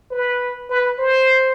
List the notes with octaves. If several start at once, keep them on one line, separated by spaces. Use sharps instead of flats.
B4
B4
C5